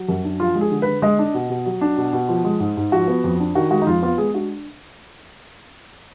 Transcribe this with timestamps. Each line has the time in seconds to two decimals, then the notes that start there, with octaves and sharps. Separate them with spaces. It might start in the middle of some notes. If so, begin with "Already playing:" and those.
Already playing: F#3
0.08 F#2
0.24 D4
0.40 F3 F4
0.55 G#3
0.61 G#4
0.71 D3
0.82 D3 B4
1.02 G#3 D#5
1.19 D4
1.34 B2
1.50 B2
1.66 F#3
1.81 D4
1.97 B2
2.13 B2
2.29 F3
2.45 G#3
2.60 G#2
2.77 G#2
2.92 F3 F#4
3.08 B3
3.24 F2
3.40 D4
3.55 D#3 F#4
3.71 G#3 F#4
3.82 D#4
3.86 F2 F4
4.03 B3 F4
4.18 G#3 G#4
4.34 D4 F#4